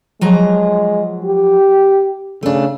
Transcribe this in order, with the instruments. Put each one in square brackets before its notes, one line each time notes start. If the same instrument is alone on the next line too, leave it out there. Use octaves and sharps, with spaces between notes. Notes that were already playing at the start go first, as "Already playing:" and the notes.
[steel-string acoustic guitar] F3 F#3 A#5 [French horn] G#3
[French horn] G4
[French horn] C#3 [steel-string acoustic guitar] A3 D4